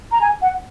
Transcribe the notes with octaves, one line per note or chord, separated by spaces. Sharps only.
A#5
G#5
F#5